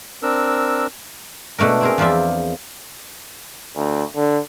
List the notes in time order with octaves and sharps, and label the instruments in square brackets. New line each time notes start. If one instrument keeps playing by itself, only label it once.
[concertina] C4 D4 A#4 E6
[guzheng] B2 A3 D4 A#4
C4 G#4 A#4
E2 F3 F4 D5 E5
[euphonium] D2
D3